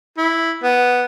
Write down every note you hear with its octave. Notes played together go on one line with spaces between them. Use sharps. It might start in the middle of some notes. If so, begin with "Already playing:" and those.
E4
B3